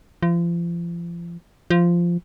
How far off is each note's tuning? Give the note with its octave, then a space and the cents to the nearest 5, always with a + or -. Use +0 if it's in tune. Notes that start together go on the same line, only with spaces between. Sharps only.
F3 -35
F3 -10